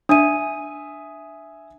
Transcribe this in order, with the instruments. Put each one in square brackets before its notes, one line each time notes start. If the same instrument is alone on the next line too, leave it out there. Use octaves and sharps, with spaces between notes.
[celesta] D4 D#7 [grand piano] E5 G#5 D#6